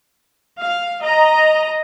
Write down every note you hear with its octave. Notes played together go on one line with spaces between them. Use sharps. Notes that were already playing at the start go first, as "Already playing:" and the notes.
F5
D#5 A#5